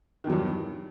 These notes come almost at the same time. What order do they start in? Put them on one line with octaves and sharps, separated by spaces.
D#3 E2 F#3 G2